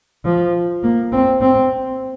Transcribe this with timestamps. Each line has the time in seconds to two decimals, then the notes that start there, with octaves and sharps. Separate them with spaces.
0.25 F3
0.83 A#3
1.12 C4
1.41 C4